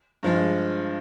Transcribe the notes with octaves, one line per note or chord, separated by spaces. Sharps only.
G2 F3 G#3